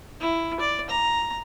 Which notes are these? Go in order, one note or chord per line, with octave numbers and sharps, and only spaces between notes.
E4
D5
A#5